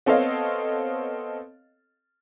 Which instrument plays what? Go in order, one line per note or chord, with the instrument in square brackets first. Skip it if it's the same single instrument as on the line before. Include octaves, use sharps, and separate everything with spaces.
[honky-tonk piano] B3 C4 A4 C#5 D#5 F5